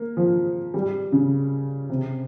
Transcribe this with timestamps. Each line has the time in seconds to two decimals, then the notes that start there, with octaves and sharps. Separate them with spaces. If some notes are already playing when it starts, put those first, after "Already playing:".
Already playing: A#3
0.17 F3
0.74 G3
1.12 C#3
1.89 C3